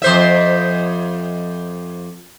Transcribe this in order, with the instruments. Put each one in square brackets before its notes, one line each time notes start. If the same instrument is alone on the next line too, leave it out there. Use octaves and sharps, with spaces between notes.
[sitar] F2 C5 E5